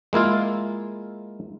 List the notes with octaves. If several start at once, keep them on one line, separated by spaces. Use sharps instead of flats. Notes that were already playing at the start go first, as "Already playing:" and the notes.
G#3 A#3 E4 F4